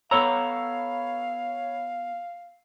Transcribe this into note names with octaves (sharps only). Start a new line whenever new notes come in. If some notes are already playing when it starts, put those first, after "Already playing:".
B3 A4 C#5 F5 A#5 B5 E6